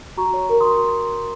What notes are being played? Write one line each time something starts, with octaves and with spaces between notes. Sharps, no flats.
F#4 A#5 C#6
C#5
A#4
F#4 C6 D#6